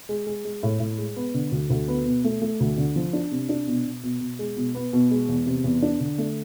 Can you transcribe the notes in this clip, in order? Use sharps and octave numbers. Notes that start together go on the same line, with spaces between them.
G#3
G#3
G#3
A2
A2
G#3
B3
D3
D2
D2
B3
B2
A3
A3
D2
D3
F3
D4
C3
D4
B2
B2
B2
B2
G#3
B2
B3
B2
G#3
E2
C3
E2
D4
D3
A3